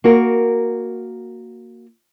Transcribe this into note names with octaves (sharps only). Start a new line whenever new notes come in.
A#3 F#4 A#4